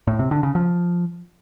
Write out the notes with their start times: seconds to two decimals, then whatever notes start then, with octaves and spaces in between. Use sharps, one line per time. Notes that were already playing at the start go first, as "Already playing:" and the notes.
0.07 A2
0.19 C3
0.31 D3
0.43 C#3
0.55 F3